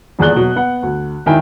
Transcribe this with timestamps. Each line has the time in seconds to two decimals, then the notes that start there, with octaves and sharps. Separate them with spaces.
0.19 D#1 E2 G#4 D5 F#6 G7
0.36 B2 F#3
0.56 B3 F#5
0.83 D2
1.26 E1 D#3 E4 G5 G#5